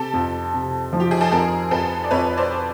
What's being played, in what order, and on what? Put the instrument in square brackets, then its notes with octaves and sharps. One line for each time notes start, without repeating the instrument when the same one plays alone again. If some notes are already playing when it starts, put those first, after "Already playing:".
Already playing: [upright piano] C3 [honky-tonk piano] G4 A4
[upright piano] F2
C3
F3
[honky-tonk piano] G4
G#4
A4
[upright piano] F2 [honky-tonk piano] G#4 A#4
[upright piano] F2 [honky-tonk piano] A4 B4
[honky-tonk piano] D5
[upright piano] F2 [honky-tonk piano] B4 C#5
[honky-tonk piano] C5 D5